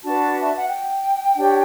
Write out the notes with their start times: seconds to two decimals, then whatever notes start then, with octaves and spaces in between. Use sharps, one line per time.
0.03 D4 F#4 B4 A5
0.42 E5
0.56 F#5
0.69 G5
1.35 D4 G4 C#5